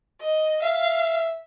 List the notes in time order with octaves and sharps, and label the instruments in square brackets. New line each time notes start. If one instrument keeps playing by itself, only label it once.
[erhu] D#5
[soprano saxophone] E5 [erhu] F5